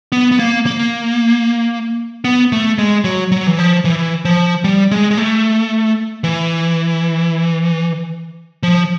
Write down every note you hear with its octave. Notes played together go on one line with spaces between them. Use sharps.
B3
B3
A#3
A#3
B3
A3
G#3
F#3
F#3
E3
F3
E3
F3
G3
G#3
G#3
A3
E3
F3